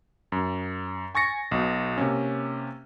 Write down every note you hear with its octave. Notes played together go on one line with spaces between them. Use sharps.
F#2
G#5 C#6 A6 A#6 C#7
B1 B2
C3 A#3 C#4